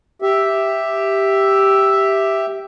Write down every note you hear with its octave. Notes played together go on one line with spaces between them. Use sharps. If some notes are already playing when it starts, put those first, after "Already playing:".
G4 E5